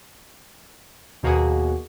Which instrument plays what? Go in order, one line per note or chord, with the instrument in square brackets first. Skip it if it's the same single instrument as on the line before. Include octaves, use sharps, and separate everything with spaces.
[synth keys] D#2 B2 A#3 F#4 G#4